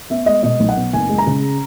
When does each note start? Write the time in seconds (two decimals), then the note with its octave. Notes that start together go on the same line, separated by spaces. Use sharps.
0.10 B3 E5
0.26 G#3 D#5
0.43 B2 D#5
0.60 B1
0.69 F#5
0.77 B3
0.93 F#1 G#5
1.09 G#3
1.18 A#5
1.27 C#3